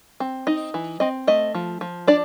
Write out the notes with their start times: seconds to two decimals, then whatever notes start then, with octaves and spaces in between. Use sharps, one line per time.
0.20 C4
0.47 D#4 D#5
0.74 E3
1.00 C4 D#5
1.27 A3 D#5
1.54 F3
1.81 F3
2.07 D4 D5